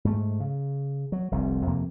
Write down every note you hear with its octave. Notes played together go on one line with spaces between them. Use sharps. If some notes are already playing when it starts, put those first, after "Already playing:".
G#2 A3
C#3
F#3
F1 C2 C3
F2 C3 F3 A#3